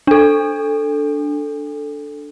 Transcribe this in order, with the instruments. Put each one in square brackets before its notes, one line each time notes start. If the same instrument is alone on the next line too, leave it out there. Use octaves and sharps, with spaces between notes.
[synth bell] D4 A4